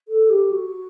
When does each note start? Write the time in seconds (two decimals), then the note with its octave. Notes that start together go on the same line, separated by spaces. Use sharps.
0.08 A4
0.30 G4
0.51 F#4